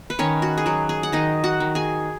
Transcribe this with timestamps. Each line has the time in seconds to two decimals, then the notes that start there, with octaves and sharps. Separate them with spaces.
0.10 B4
0.19 D#3 C#4 C#5
0.42 F#4
0.58 G#4
0.66 F#3 F#4
0.89 G#4
1.03 F#5
1.12 D#3 D#4 D#5
1.44 F#4 F#5
1.60 D#3
1.75 G#4 G#5